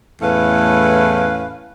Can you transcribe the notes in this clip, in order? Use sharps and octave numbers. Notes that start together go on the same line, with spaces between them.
E2 A2 A3 C#4 B4 F5